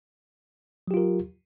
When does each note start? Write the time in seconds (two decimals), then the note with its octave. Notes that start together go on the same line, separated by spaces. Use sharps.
0.87 F#3
0.91 G4
0.94 F4
0.97 A#4